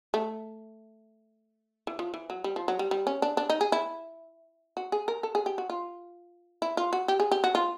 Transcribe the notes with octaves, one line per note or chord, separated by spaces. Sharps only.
A3
E3
F3
E3
F#3
G3
F3
F#3
G3
G3
C#4
D4
D4
D#4
G#4
E4
F#4
G#4
A#4
A4
G#4
G4
F#4
F4
E4
F4
F#4
G4
G#4
G4
F#4
F4